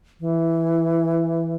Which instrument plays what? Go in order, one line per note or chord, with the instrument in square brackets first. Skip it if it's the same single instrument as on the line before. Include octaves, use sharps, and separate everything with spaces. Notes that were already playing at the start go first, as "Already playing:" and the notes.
[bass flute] E3